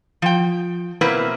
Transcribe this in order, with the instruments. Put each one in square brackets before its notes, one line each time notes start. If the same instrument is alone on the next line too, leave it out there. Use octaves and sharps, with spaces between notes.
[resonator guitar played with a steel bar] F3 G5
B2 A#3 C4 E4 A#4 B4